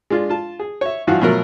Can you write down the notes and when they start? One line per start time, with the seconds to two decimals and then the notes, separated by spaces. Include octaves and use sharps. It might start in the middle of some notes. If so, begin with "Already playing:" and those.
0.10 G#3 D4 F4
0.30 F4 A5
0.59 G#4
0.81 C#5 E5
1.07 G2 E3 F3 F#4 F5 F#5
1.21 B2 F3 F#3 A3 A#4